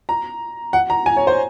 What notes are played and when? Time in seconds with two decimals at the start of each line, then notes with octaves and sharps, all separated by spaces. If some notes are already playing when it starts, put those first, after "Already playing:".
0.09 A#5
0.73 F#5
0.90 A#5
1.06 G#5
1.17 C#5
1.27 C5